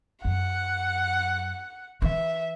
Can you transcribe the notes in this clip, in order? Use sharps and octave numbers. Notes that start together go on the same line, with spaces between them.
F#2 F#5
E3 E5